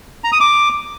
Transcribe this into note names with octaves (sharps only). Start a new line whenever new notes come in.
A#5
D#6
D6